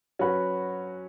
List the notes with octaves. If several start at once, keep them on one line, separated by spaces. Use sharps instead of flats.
F#3 C#4 F#4 B4